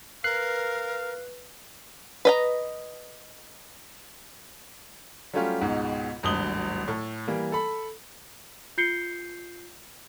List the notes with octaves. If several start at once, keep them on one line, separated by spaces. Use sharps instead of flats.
A#4 B4 F5 F#6 C7
B4 D#5 A#5
F#3 G3 A3 C#4 F4 G4
C#2 G#2 B2 D#4
D1 G#1 G2 D#6 F#7 G7
A2 A4
E3 G3 A#3
A4 B5
F4 G6 C7 C#7 G7